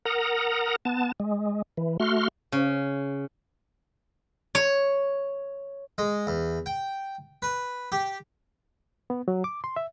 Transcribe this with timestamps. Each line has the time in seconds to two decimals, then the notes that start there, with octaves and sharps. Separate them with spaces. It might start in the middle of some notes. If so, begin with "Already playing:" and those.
0.05 A#4 F#5 A#5 D#6
0.85 B3 A5
1.20 G#3
1.77 E3
2.00 A3 F#4 C6 F6
2.52 C#3
4.55 C#5
5.98 G#3
6.27 E2
6.66 G5
7.42 B4
7.92 G4
9.10 B3
9.28 F#3
9.44 D6
9.64 C6
9.76 E5